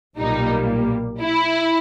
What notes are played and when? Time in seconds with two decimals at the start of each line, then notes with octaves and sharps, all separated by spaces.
0.18 B1 A#2 G3 A#3 D#4
1.21 E4